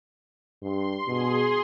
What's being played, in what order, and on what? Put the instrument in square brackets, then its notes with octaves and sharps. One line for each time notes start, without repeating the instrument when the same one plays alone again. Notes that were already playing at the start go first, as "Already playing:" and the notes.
[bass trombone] G2 [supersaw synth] C6
[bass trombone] B2 [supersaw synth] G#4 C6